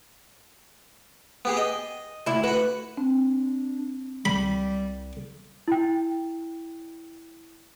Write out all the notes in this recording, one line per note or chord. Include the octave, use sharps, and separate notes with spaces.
B3 G4 G#4
D#5
D2 E4
F#4 B4 F#5
C4 D4
C2 G3 B5
E4 G5